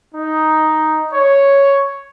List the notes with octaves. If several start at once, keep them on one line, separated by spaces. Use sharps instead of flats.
D#4
C#5